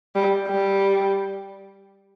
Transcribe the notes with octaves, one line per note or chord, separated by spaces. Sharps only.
G3
G3